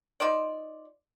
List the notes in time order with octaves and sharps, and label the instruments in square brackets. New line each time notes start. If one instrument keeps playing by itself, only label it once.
[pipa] D#4 F4 C5 D5